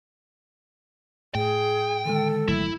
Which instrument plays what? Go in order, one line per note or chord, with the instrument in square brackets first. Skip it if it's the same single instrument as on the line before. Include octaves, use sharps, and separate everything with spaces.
[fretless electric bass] A2 [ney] G#4 [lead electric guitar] G5
[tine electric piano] D3 D#3 G#3 [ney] A4
[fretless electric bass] G1 F#3 A3 [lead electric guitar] E4